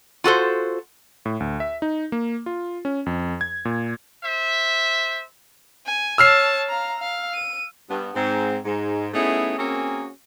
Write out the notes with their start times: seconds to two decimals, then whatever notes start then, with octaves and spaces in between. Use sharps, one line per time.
0.24 F4 F#4 A4 C5
1.26 A2
1.40 D2
1.60 E5
1.82 D#4
2.12 A#3
2.46 F4
2.85 C#4
3.06 F2
3.41 G#6
3.65 A#2
4.24 C5 E5
5.86 G#5
6.18 C#5 A5 E6 F6 C7
6.68 F5 A#5
7.00 F5
7.34 D#7
7.90 G2 B3
8.15 G#2 C4
8.65 G#2
9.13 A3 B3 C#4 D#4 E4 G#4
9.59 A#3 C4 C#4 F#4 G#4 A#4